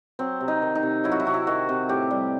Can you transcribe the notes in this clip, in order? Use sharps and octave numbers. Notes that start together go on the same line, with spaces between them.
F#3 C4
C3
D#4
D#3
D#4
C3
F#3 E4
F#4
E4
C3 F#4
E4
D#3 F#4
C3
A2 G4
G3